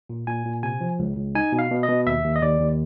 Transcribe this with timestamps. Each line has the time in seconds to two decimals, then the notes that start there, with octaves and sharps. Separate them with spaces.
0.10 A#2
0.27 A#2 G#5
0.46 A#2
0.63 C3 G#5
0.81 F3
0.99 C#2
1.17 C#2
1.35 D#4 G#5
1.52 B2
1.59 F5
1.71 B2
1.83 D#5
1.89 B2
2.06 D#2 E5
2.25 D#2
2.36 D#5
2.42 D#2 D5
2.60 D#2